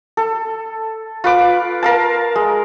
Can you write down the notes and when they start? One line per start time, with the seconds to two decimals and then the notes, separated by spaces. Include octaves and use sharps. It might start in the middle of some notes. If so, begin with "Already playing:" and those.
0.17 A4
1.24 F4 B4 D6
1.83 A#4 F5 A5
2.36 G#3